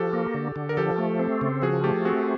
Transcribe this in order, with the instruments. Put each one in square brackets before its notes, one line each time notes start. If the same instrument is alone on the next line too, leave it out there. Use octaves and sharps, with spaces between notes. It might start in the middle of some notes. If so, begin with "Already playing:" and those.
Already playing: [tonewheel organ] F3 [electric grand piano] F#4 G4 A4
[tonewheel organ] A#3
D3
D3
[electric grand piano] A#4
[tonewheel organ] F3 [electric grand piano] G4 A4
[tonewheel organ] A3
C4
C#3
[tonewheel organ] F3 [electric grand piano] F#4 G#4
[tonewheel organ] A3 [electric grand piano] G4 A4
[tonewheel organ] C4 [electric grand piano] F#4 G#4